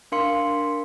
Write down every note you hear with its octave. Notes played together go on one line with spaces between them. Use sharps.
D4 A#4 F5 C6 C#7